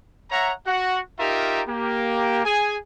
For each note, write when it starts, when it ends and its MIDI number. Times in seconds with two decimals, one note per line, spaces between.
0.31 0.53 73
0.31 0.53 76
0.31 0.53 78
0.31 0.53 82
0.66 1.00 66
0.66 1.00 78
1.19 1.61 63
1.19 1.61 65
1.19 1.61 67
1.19 1.61 70
1.19 1.61 76
1.19 1.61 82
1.67 2.42 58
1.67 2.42 67
2.44 2.77 68
2.44 2.77 80